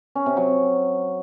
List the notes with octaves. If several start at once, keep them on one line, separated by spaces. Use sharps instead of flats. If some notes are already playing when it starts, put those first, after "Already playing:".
C#4
C3
F#3